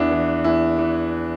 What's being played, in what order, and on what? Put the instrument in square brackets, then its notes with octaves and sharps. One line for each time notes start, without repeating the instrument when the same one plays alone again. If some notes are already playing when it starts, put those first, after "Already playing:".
Already playing: [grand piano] E2 D4 E4
E3
E2 E4
E3